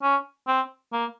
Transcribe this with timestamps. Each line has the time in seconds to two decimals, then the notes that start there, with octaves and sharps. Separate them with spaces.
0.02 C#4
0.48 C4
0.92 A#3